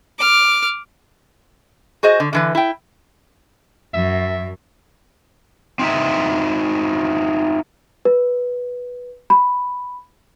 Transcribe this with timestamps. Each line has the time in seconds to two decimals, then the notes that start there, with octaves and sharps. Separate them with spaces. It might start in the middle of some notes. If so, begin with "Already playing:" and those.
0.18 D6 F6
2.03 F#4 G#4 C5 D#5
2.20 D3
2.33 D3 E3 B4
2.55 E4 G5
3.94 F#2 E5
5.79 C4 D#4 E5
8.05 B4
9.30 B5